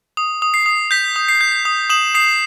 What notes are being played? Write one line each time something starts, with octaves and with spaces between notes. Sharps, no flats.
D#6
D#6
C7
D#6
G6 B6
D#6
C7
G6
D#6
D#6 E7 F#7
D#6 C7